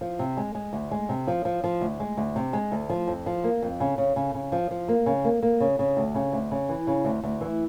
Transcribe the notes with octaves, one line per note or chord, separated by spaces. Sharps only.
F3
C3
G#3
G#3
D2
G#3
C3
F3
F3
F3
D2
G#3
D2
C3
G#3
D2
F3
F2
F3
A#3
F2
C#3
C#3
C#3
C#3
F3
F3
A#3
C#3
A#3
A#3
C#3
C#3
D2
C#3
D2
C#3
E3
C#3
D2
D2
E3